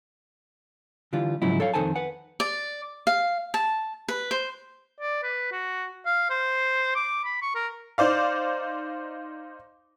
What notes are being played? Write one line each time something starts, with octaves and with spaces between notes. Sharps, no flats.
D3 E3 G3 F4
G#2 C#3 F3 F#3 D#4 E4
A4 C#5 F5
F2 D#3 A4 C5 G#5 A5
B4 F#5
D5
F5
A5
B4
C5
D5
B4
F#4
F5
C5
D6
B5
C#6
A#4
D#4 C5 D5 F5